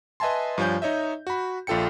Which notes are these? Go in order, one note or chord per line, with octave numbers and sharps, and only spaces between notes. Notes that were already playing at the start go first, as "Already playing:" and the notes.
B4 D#5 E5 G#5 A5 C6
G2 F3 F4 C#5 G#5 G6
D#4 C#5 D#5 E5
F#4 B5
A#1 F4 A4 G5 C#7